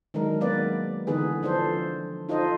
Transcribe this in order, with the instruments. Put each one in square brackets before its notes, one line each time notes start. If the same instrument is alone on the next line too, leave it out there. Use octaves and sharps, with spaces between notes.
[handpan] D#3 F#3 G#3 D4 A#4
F#3 A#3 B3 B4 D5 F5
D3 E3 B3 D#4 G#4 B4
F3 D4 A4 C5
D#4 F4 A4 C5 D#5